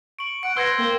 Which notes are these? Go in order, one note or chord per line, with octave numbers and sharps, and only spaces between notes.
C#6 D7 F#7
F#5 C#7 D7
B4 C5 E6 G#6 A#6
A#3 G5